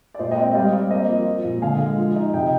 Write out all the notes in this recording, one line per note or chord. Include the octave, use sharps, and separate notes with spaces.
D5
A#2 C5 D#5
D#5 G5
C4
D#5 G5
G3 D5 F5
C4
A#3 C5 D#5
F3
F3
A#2
D3 F5 G#5
G#3
F3
D#4
C3 D#5 G5